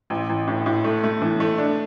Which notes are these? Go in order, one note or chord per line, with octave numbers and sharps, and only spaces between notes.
A1
A1
A2
A2
A3
A3
E3
A3
D4